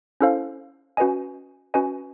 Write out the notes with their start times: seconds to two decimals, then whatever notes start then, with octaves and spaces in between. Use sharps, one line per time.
0.21 C#4 E4 A4 C5 F5
0.97 C#4 F#4 B4 D#5 G#5
1.74 C#4 F#4 B4 D#5 G#5